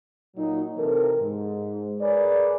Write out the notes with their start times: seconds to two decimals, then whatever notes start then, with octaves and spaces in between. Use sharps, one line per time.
0.36 A#2 F#3 D#4
0.77 C3 E3 C4 A4 A#4
1.20 G#2
2.00 G#4 A#4 B4 C#5 D5